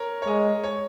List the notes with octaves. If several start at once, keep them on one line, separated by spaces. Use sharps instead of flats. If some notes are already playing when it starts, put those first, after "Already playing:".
Already playing: A#4 C#5
C#5
G#3 D#5
C#5